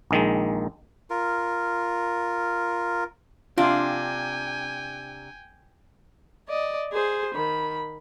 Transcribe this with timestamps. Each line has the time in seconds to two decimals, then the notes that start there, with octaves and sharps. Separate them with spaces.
0.11 A#1 D#3 G#3
1.10 F4 A#4
3.58 C3 D4 F4 G5 G#5
6.49 D5 D#5
6.93 G#4 C5
7.35 D#3 B5